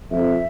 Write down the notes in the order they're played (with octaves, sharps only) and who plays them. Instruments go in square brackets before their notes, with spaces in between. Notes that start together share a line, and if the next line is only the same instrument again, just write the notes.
[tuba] F2 [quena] E5